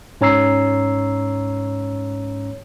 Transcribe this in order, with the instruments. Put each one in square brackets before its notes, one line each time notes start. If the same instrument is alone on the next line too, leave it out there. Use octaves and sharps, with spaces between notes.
[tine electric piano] G#2 C#4 C#5 A#5 E6 C7